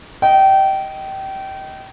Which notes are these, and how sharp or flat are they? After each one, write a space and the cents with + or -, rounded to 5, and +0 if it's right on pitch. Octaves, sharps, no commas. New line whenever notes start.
D#5 +10 G5 -25